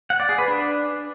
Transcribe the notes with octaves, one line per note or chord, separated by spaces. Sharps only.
F#5
D5
G#4
B4
D4